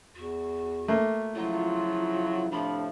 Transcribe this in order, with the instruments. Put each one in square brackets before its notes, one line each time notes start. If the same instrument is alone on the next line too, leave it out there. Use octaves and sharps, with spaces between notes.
[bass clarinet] E2 [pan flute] F#4
[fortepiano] A3 A#3
[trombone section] C#3 F3 F#3 [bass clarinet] E4 [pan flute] F4
[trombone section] A2 C3 F3 [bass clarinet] D4 [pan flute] B5